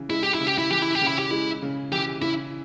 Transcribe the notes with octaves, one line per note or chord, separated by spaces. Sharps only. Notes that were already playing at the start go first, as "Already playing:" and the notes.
Already playing: C#3 E3
G#3 E4
G4
E4
C#3
G4
E4
E3 G4
E4
G4
C#3
E4
G4
G#3 E4
C#3
E3 G4
C#3 E4